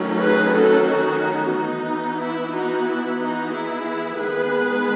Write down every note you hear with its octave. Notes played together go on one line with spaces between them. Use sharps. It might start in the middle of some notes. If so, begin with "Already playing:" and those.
Already playing: D#3 F#3 A3 C#4
G#4 B4
F#4 A4
D#4 F#4
E3 B3 D#4
E4
D#4 F#4
E4
D#4 F#4
E4 G#4
D#3 G#3 B3 G#4 B4